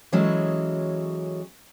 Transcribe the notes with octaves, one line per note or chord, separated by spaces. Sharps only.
E3 F#3 G#3 C#4 A4